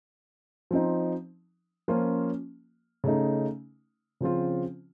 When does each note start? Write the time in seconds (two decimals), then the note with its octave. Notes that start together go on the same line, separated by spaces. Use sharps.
0.71 F3 C4 D#4
1.88 F3 A#3 C#4 F4
3.04 C#3 A3 D#4
4.21 C#3 F3 C4 F4